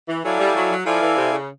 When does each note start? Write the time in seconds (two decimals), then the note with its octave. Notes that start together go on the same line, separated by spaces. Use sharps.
0.09 E3
0.24 F#3 E4 A4 D5 F5 G#5
0.40 G3
0.55 F#3
0.71 F#3
0.86 F3 E4 A4 D5 F5 G#5
1.02 E3
1.17 C3
1.32 C#3